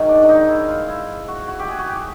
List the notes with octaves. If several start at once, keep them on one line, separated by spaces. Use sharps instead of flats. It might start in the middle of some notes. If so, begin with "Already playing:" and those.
Already playing: G#2 D#3 F#3
D4
D4
D#4
E4
F4
E4
F#4
F#4
G4
G#4
F#4
G4